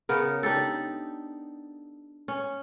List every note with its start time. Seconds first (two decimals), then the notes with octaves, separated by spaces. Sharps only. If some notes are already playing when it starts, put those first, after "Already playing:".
0.09 C#3 B3 A#4
0.43 D4 D#4 G4 A4
2.28 C#4